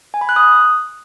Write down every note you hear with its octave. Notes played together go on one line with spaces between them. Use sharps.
G#5
B5
F#6
D#6